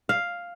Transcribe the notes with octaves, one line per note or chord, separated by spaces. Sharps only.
F5